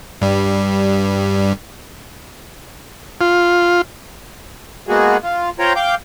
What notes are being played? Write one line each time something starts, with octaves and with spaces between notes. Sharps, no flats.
G2 G3
F4
G#3 A#3 B3 F#4 G#4
F4
F4 C5 C#5 G5 A#5
F5 G5 D6 G6